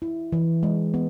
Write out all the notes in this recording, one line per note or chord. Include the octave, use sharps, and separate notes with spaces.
E4
E3
G#3
B3